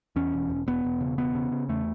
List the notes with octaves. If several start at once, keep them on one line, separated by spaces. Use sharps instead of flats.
E2 C#4
E1
E1
E1 B3
E1
C#3
E1 B3
C#3
C#3
E2 A3